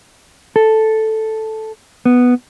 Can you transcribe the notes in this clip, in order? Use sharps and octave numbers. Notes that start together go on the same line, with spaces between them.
A4
B3